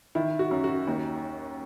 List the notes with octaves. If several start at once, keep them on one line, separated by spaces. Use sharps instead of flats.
D#3 E4
F#4
F#2
F#4
D#2